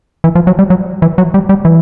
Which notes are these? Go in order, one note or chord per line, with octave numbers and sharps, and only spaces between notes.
E3
F3
F#3
G3
F#3
E3
F#3
G3
G3
E3